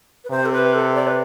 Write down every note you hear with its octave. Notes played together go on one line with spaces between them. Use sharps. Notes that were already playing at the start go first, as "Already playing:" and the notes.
B4
C3 C5
A4
B4
A4
D5
B4